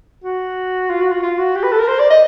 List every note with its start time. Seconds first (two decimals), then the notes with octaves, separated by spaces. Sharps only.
0.24 F#4
0.89 F4
1.01 F#4
1.11 F4
1.22 F4
1.39 F#4
1.55 G4
1.63 B4
1.72 A4
1.79 A#4
1.88 C5
1.99 D5
2.10 D#5